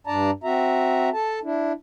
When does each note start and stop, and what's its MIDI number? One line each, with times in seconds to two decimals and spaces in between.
0.07 0.31 43
0.07 0.31 62
0.07 0.31 74
0.07 0.31 81
0.07 0.31 82
0.44 1.09 60
0.44 1.09 66
0.44 1.09 76
0.44 1.09 82
1.13 1.39 69
1.13 1.39 81
1.43 1.73 62
1.43 1.73 64